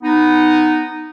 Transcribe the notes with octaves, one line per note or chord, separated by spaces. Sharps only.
B3 D#4